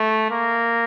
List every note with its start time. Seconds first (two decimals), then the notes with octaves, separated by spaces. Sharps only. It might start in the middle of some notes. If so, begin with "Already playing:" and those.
Already playing: A3
0.30 A#3